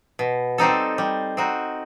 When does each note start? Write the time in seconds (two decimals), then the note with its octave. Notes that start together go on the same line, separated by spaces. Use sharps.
0.19 B2
0.58 G3 C4 D#4 A4
0.98 G3
1.37 C4 D#4 F#4